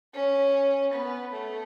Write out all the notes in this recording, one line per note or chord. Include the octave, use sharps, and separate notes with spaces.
C#4
B3
A3